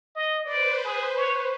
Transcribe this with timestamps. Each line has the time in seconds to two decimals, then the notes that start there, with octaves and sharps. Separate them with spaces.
0.15 D#5
0.45 B4 C5 D5
0.84 G#4
1.17 C#5